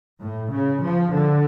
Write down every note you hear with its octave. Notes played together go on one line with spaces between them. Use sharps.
A2
C#3
F3
D3